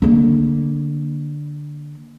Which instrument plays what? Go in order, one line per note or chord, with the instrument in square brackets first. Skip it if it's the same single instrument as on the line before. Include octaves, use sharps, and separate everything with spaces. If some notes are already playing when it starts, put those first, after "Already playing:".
[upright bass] D3 A#3